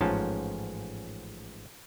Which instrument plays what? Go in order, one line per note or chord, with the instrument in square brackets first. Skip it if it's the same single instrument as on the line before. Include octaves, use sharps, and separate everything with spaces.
[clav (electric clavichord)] A1 G#2 F3 C#4 A5